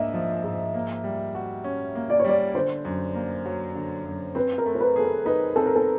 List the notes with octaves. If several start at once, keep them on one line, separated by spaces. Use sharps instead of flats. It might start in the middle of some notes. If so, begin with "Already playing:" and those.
Already playing: G#2 A#3 D4 D#5 E5
F3
G#2
A#3
G3
F#4
C#4
A#3
D5
C#5
G3 D5
D3 C5
F#2
A#3
F#3
D3
F#2
C4 B4
A#4
A3
C5
B4
G#4 A4
A#4
D#4 B4
C4 A4
A#4
A4